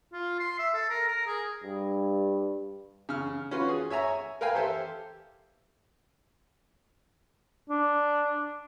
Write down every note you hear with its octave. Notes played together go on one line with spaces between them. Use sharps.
F4
C6
E5
A4
A#4
A#4
G#4
G2
C#3 F6
C#4 F4 F#4 B4
G#4
C#5 E5 G#5 A#5
A#4 B4 F5 G5 G#5
G4 A4 C5 E5
D4